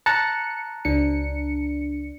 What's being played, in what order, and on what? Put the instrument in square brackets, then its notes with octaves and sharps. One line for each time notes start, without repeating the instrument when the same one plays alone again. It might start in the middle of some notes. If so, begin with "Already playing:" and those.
[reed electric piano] A5 A#5 F#6 [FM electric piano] C#7
[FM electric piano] C#2 D4 C#7